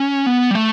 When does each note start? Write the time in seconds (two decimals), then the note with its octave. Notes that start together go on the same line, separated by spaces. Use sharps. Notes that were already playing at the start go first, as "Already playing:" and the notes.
Already playing: C#4
0.26 B3
0.51 G3
0.55 A3